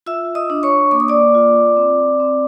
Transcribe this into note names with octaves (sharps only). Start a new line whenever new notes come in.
F4 E5 E6
D#5 D#6
D4
C#5 C#6
A#3 D6
D#6
D5 D6
F4
C4
C4